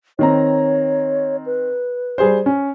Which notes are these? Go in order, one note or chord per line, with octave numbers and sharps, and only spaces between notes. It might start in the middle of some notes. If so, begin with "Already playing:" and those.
D#3 C4 C#5 A#5
B4
G3 G#4 C5
C#4